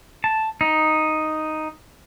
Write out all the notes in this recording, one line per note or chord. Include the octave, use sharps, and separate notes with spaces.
A5
D#4